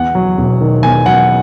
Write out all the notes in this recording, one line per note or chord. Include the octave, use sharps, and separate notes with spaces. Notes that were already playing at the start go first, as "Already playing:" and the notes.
Already playing: E2 F#5
F#3
E1
D#3
E2 G#5
F#3 F#5